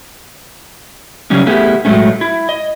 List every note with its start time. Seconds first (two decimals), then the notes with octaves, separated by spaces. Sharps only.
1.30 C#3 F#3 G3 C#4 D#4
1.47 A3 B3 E4 G4 G#4
1.85 A2 F#3 G#3 A3 C#4
2.21 E4
2.49 D#5